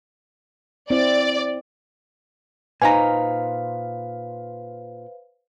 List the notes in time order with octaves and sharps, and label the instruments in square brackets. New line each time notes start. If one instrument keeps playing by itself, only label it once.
[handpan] C4 E4 [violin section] D5
[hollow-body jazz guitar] A#2 D#4 [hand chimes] B4 C5 F5 [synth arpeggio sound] G#5 A#5